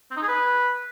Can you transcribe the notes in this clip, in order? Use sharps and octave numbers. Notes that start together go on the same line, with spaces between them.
C4
D#4
G#4
B4